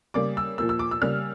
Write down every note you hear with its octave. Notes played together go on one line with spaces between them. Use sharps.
C#3 G3 A#3 D6
E6
A#2 F3 A#3 E6
E6
D6
E6
C#3 G3 A#3 F6